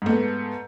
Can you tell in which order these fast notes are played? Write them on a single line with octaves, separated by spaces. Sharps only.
G#2 A3 B3